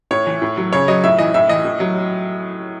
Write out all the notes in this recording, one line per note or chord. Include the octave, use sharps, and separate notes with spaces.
A2 C#5
E3
A2
F#3
C#3 C#5
F#3 D#5
A2 E5
E3 D#5
A2 E5
E3 D#5
A2
F#3